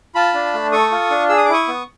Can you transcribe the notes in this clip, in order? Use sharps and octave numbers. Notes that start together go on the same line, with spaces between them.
F4 A5 B5
D4
A3
A4 C#6 D#6
F4
D4
G#4 E6
D#6
D6
E4 C#6 D#6
B3